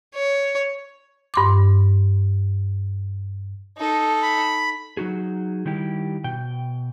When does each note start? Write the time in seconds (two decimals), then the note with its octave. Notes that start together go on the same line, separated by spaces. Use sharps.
0.15 C#5
1.34 G2 C6 D6
3.77 D#4 A4
4.22 B5
4.97 F#3 D#4 F#4 G#4
5.66 D#3 G3 E4 G4
6.24 B2 G5